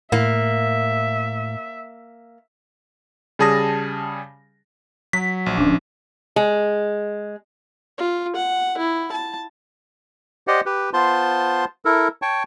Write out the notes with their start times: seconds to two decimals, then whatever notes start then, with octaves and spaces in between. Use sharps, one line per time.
0.12 A2 A#3 E5
3.39 C#3 G3 G#4 A5 D#6 A#6
5.13 F#3 B6
5.46 A#1
5.58 D1 F3 C#4 D4
6.36 G#3
7.98 F4
8.36 F#5
8.78 E4
9.12 A5
10.47 G4 C5 D5 D#5 F#5
10.66 G4 B4
10.93 B3 F4 C5 A5 C6
11.85 E4 A4 A#4
12.22 C#5 G5 A5 C#6